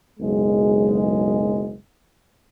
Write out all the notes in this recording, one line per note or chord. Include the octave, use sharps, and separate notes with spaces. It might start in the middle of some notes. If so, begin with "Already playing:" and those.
F#1 B1 G#3